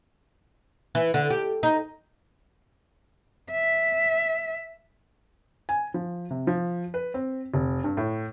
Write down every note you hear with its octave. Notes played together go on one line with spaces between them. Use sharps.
E3
D3
G4
D#4
E5
G#5
F3
C3
F3
B4
C4
F1
G2
A2